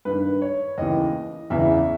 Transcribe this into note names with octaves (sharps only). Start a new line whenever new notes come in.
G2 D#3 B4
C#5
D#2 C#3 E3 D#5
E2 C#3 E3 E5